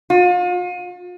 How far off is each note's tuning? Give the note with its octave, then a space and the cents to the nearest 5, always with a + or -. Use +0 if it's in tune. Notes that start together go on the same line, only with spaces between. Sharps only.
F4 +40